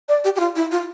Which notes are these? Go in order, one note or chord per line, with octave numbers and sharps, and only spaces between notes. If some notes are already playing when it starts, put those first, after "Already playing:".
D5
G4
G4
F4
E4
F4